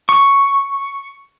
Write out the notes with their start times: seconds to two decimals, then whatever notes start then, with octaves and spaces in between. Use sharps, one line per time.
0.09 C#6